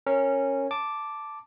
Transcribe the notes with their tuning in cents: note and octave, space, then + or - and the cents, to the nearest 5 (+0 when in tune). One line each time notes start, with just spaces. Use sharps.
C#4 -15 A#4 -20
A5 +0 D6 +0